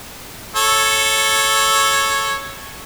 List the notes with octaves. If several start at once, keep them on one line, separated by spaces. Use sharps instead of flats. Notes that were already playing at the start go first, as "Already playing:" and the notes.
A4 C#5